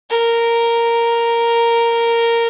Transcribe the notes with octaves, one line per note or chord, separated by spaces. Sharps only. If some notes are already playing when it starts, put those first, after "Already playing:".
A#4